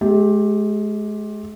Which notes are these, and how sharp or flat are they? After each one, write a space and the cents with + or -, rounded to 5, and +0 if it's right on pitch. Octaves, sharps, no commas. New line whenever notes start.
G#3 +35 G4 +0